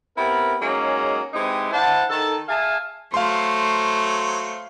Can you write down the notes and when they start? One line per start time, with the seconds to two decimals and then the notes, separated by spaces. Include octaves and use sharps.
0.17 B3 C4 E4 G4 A#4
0.61 F#3 G#3 A#3 C#4 D#4 G#4
1.34 G#3 C4 D#4 E4 G4 B4
1.72 D4 E4 C5 F#5 A5
2.10 D#3 A4 A5
2.49 G#4 E5 F5 G#5 A5
3.14 F#3 A3 C5 F5 C6